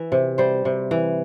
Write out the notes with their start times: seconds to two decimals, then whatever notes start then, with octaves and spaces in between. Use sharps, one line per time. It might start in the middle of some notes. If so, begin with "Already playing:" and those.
Already playing: E3 E5
0.12 C3
0.38 G3 C5
0.65 C3
0.91 E3